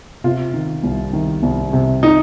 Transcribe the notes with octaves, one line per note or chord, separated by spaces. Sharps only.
C3 F4
D#3
C2
D#3
C2
C3
D#4